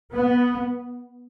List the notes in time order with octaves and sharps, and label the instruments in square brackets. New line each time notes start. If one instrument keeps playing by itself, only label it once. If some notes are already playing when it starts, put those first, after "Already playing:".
[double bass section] B3